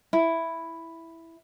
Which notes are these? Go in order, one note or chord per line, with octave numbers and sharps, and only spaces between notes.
E4